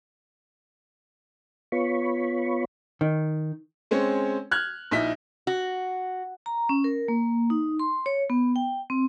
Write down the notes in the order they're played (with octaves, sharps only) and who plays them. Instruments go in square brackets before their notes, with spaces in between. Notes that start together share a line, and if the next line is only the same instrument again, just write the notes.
[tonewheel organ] B3 F4 C#5 B5 C#6
[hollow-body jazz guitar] D#3
[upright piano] G#3 C4 C#4 C#5
F6 F#6 G#6
A#1 D#4 E4 B6
[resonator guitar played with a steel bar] F#4
[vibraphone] A#5
C#4
A#4
A#3
D#4
C6
C#5
B3
G5
C4